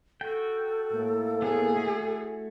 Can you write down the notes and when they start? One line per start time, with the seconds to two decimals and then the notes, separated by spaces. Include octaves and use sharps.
0.21 F#4 A4 G5
0.93 A2 A#3
1.42 A3 B3 G#4
1.76 A3 E4 F#4